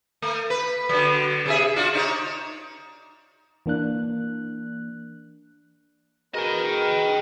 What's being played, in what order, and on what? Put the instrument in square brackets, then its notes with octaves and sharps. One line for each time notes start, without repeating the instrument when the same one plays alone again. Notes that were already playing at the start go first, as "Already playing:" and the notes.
[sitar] A3
B4
D3 F#3
C3 G#4 E5
D4 F4 F#4
D4 D#4 C#5
[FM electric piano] E3 A#3 D4 F#6
[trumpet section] A#3 A#4 [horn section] F#4 B4 [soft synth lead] G#4 [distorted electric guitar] D#5 G5